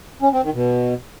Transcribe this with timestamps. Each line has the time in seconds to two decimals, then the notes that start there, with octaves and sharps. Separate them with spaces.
0.22 C#4
0.33 C4
0.43 D#3
0.54 B2